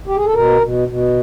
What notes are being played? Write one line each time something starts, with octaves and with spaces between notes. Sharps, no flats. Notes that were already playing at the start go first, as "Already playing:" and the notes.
G4
G#4
A4
B2 A#4
B2
B2